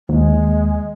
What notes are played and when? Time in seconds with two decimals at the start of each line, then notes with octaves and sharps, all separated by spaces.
0.09 D#2 G#3